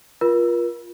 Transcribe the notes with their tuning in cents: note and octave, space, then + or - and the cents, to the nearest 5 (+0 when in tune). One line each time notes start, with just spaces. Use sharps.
F4 +0 A#4 +40